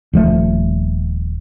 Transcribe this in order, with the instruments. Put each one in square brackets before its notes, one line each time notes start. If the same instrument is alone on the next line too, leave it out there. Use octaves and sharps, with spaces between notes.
[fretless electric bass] D#1 F3 A3